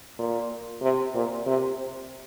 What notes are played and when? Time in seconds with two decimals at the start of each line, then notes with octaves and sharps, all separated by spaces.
0.19 A#2
0.82 C3
1.15 A#2
1.46 C3